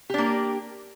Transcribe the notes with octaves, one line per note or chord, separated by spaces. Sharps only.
A#3 D4 G4